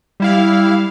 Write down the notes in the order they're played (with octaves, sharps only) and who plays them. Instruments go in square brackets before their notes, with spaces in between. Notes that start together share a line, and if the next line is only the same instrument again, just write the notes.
[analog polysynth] G3 E4 F5